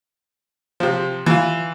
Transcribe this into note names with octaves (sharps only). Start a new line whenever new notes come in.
C3 F3
E3 F4